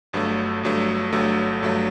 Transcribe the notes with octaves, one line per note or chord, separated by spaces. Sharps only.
G1 G2 F#3 A3
G1 G2 F#3 A3
G1 G2 F#3 A3
G1 G2 F#3 A3